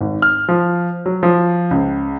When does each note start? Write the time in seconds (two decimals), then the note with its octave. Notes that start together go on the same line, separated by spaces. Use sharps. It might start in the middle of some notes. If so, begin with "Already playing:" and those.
0.01 G#1
0.22 F6
0.48 F3
1.06 F#3
1.23 F3
1.71 C#2